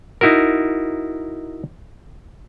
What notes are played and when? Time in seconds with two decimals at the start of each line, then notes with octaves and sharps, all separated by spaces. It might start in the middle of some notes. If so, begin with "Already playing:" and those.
0.21 D#4 E4 F#4 A#4